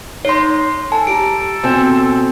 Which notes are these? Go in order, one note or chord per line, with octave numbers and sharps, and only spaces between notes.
D#4 C#5 C6 C7
A4 G#5 A5
G4 A#5 D7
B2 C4 G#5 E7